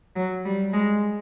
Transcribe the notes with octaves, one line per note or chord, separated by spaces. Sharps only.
F#3
G3
G#3